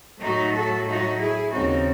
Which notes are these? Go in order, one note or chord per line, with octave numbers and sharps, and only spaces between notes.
A2 F#3 A3 D#4 F#4
F#4 A4
D#4 F#4
E4 G#4
D#2 C#3 G#3 C4 D#4 F#4